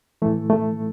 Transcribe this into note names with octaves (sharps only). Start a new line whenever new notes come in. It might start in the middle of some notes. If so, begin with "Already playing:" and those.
A2 E3 A3
A3